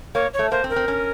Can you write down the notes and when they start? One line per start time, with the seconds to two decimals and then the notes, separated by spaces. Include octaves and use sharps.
0.15 A#3 C#5
0.34 C#5
0.39 A3
0.51 A#3 C5
0.64 C4
0.70 A#4
0.76 C4
0.88 C#4